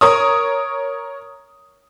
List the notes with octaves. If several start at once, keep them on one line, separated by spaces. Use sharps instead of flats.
A#4 C#5 D#6